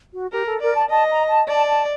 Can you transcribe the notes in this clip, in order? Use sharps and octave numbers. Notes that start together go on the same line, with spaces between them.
F#4
G4 A#4
A4
A#4 D5
A5
D#5 A5
A#5
A5
D5 A5
A5